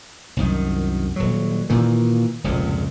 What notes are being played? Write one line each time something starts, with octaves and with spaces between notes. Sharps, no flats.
C2 F#2 D#3
D#1 F#3
A#2 D#3 E3
F1 C#2 A#2